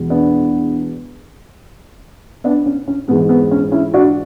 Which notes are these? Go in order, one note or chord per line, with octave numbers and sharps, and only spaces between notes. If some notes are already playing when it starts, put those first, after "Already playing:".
Already playing: E2 B2 G#3
B3 D4
B3 D4
C#4
C#4
G#2 E3 G#3 B3
B3
C#4
C#4 E4
D4 F#4